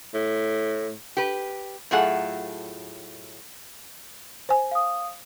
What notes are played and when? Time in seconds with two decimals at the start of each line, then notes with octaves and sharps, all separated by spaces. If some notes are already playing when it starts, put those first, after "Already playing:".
0.14 A2
1.17 G4 B4
1.91 A2 F#3 A3 F4 G#4 F#5
4.49 C5 G#5
4.71 F5 D#6